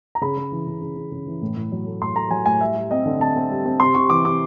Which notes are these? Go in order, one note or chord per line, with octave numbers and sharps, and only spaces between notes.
A#5
C#3 B5
C#3
E3
C#3
C#3
C#3
C#3
E3
A2
A2
F#3
A3
A2 C6
A3 A#5
F#3 G#5
A2 G#5
G3 E5
G3
C4 D#5
D3
C4 A5
C4
G3
C4
C3 C6
C3 C#6
E3 D6
C3 D6